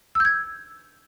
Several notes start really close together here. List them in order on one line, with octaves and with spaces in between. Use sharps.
E6 G6 G#6